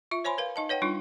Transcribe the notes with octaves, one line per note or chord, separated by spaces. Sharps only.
F4 E5
C5 C#5 G#5 B5 C6
A#4 B4 F5
D#4 D#5 A5
B4 C#5 F#5 G5
G3 D4 D#4 F4